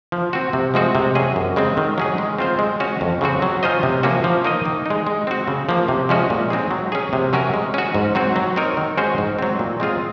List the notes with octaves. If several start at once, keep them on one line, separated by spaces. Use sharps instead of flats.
F3
C4 F#4
C3
F3 G#3 C4 F#4
C3
F#3 C#4 G#4 D#5
F#2
C#3 G#3 C4
D#3
F#3 C#4 G#4
G#3
C4 F4 C5
G#3
C#4 F#4 C#5
F2
C#3 F#3 C4 F#4
F#3
C#4 F4 C5 D#5
C3
F3 A#3 C#4 F#4
F3
A#3 D#4 A#4 D#5
D#3
G#3 D#4
G#3
C4 F#4
C#3
F3 A#3
C3
F3 G#3 C#4 F#4
A#2
G#3 C4 D#4 G#4
F#3
C#4 G#4
C3
F#3 C#4 F#4 A#4
G#3
C#4 F#4
G#2
F#3 C4 F#4
F#3
C4 D#4 A#4 C#5
D#3
G#3 C#4 F#4 C5
G#2
F#3 C4
A#2
G#3 C4 F4 G#4